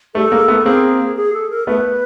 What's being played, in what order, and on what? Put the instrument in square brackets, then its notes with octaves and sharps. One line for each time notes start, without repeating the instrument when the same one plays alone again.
[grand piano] G3 A3 [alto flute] A4
[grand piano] G#3 A#3
A3 B3
[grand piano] A#3 C4 [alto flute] G#4
[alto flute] G#4
A4
A#4
[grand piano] A3 B3 [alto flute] B4